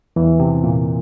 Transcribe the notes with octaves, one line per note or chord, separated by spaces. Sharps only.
E2 E3
C3
A#2